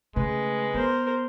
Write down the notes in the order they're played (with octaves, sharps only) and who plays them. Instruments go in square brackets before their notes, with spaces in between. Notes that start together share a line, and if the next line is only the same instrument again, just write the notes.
[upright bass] C#3 A3 [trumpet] G#3 [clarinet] B4
[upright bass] B3 [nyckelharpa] A#4 C5